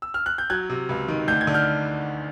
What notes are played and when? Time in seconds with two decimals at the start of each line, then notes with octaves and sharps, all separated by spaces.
0.02 E6
0.14 F6
0.26 F#6
0.38 G6
0.50 F#3 F#6 G#6
0.70 C3
0.89 C#2
1.08 D#3
1.28 D2 G6
1.41 G#6
1.47 D3
1.54 F6 G6